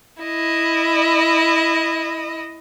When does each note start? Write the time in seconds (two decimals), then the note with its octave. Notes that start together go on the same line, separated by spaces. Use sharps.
0.23 E4 D#5